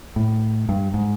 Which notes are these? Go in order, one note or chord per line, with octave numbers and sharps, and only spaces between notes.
A2
G2
G#2